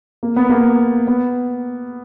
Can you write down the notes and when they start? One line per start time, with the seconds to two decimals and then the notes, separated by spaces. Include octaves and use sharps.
0.23 A#3
0.36 B3
0.50 A#3
1.07 B3